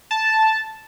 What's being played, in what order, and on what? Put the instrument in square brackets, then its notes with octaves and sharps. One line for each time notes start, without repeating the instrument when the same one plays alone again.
[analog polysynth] A5